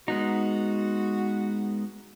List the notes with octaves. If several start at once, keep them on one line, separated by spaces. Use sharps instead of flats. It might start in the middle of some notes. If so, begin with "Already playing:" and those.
G#3 B3 D#4 F#4